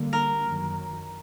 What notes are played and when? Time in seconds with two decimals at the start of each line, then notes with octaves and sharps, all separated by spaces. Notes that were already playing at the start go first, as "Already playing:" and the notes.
Already playing: D3 G3 A#3
0.13 A#4
0.44 F#2 D#3 F#3